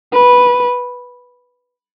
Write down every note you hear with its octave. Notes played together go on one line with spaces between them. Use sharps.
B4